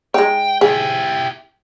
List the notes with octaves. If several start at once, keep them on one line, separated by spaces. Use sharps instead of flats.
G#3 D#4 G5
E4 G4 G#4